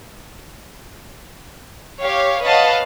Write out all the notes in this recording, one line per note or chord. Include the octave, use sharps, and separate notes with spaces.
G4 C#5 F5
B4 C#5 D#5 F5 F#5 A5